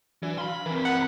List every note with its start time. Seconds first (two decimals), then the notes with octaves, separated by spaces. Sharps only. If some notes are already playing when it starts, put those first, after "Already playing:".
0.23 E3 F#3 D4
0.38 F5 B5 C6
0.66 E3 C4 A#4 B4 B5
0.85 F#5